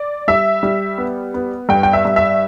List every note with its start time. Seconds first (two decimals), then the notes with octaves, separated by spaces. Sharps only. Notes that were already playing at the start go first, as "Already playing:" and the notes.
Already playing: D5
0.28 G3 E5
0.63 G3
0.98 B3
1.34 B3
1.69 G2 G5
1.83 G5
1.93 E5
2.05 G2
2.16 E5